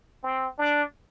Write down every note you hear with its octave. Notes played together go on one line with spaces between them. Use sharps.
C4
D4